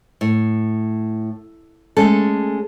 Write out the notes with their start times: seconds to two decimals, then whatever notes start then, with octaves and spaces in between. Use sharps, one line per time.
0.21 A2
1.97 G#3 A3 C#4 A4